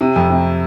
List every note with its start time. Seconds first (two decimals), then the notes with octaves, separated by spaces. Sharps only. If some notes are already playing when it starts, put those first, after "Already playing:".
0.01 C3
0.16 F2
0.30 C3